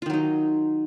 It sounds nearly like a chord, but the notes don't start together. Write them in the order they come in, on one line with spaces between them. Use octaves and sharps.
F4 D#3 F#3 D#4